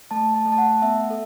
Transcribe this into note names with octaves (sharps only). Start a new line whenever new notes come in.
A3 A5
A5
A3
A5
F#5
B3 E5
A4